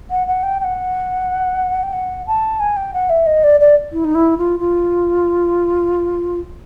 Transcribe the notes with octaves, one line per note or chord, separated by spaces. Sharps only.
F#5
F#5
G5
G5
F#5
G5
F#5
A5
G#5
G5
F#5
E5
D#5
D5
D5
E4
D#4
E4
F4
F4